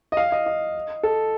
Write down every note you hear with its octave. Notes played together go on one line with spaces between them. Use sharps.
D#5
F5
D#5
D#5
A4